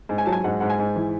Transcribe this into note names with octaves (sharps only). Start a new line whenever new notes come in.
G#2
G#5
F#3 A5
G#5
G#2 F#5
G#2 F#5
G#5
G#2
E3